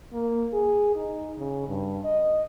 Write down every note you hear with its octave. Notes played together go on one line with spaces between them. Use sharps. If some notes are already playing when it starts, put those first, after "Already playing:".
A#3
G#4
D#4
C#3
G2
D#5